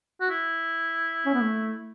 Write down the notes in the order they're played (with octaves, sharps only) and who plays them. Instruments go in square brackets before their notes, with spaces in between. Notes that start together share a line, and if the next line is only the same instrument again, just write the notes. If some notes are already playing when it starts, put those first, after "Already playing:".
[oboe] F#4
E4
[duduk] C#4
B3
A3